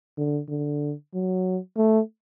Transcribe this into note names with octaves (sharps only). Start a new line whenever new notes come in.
D3
D3
F#3
A3